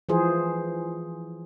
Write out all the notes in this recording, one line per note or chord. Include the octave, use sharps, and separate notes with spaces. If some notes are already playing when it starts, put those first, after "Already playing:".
E3 F3 G#4 C5